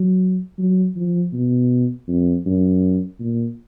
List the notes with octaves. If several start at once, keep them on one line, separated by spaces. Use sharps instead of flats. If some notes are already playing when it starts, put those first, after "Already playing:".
Already playing: F#3
F#3
F3
B2
F2
F#2
A#2